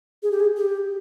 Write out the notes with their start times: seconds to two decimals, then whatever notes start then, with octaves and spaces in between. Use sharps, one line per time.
0.23 G#4
0.32 G4
0.40 G#4
0.57 G4